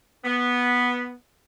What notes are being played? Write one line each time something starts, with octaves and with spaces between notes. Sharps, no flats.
B3